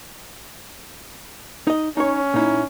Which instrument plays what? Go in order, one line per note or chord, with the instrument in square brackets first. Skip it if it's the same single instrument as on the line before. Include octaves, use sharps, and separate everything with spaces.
[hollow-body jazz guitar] D#4 D#5
[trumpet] C#4 [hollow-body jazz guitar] D#4 C#5
[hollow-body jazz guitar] A#2 D#4 E4